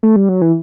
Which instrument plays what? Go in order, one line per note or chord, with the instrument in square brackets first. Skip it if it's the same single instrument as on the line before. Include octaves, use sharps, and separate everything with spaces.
[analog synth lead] A3
G3
F#3
E3